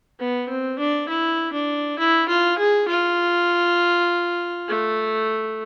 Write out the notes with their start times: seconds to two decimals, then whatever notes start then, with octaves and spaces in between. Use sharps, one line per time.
0.19 B3
0.49 C4
0.79 D4
1.09 E4
1.53 D4
1.99 E4
2.29 F4
2.58 G#4
2.88 F4
4.68 A3